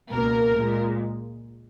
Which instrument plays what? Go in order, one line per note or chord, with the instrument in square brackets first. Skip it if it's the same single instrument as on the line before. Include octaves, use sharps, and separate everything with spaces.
[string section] C#2 B2 A#3 A#4
A#2 G#3